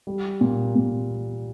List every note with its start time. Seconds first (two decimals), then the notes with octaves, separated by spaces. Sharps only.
0.07 G3
0.41 A#2
0.75 A#2